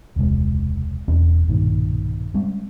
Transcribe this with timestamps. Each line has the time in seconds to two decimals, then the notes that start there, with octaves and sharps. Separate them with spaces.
0.16 E1 C#2 C3 G#3
1.08 E1 E2 C4 C#4
1.48 B1 G2 A#2 D#3
2.34 G3 G#3 C4 C#4